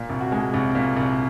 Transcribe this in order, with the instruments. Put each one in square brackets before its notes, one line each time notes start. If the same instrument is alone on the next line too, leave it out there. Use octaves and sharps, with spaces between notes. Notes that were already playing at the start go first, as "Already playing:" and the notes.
Already playing: [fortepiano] A#2
C2
F#4
G#3
C2
A#2
C2